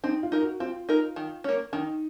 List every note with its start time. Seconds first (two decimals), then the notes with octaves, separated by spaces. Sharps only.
0.03 C4 D#4
0.23 F4
0.32 D#4 A#4
0.42 F#4
0.60 C4 F4
0.89 D#4 A#4
1.16 D#3
1.44 A#3 C#4
1.73 D#3 D#4